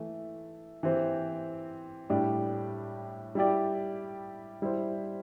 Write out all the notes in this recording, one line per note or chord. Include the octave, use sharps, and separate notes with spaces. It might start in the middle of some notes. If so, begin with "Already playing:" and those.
Already playing: E3 A3
E3 C4 G4 C5
A2 G3 D4 G4
G3 E4 G4 D5
G3 E4 C5